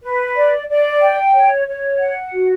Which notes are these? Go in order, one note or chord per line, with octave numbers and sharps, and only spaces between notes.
B4
D5
D5
G5
C#5
C#5
F#5
F#4